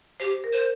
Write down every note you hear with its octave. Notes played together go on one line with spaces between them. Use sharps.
G4 C5
A#4
C5